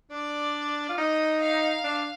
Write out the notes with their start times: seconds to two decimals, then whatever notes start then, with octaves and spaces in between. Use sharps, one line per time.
0.11 D4 D5
0.89 F4
0.98 D#4 D#5
1.41 F5
1.84 D4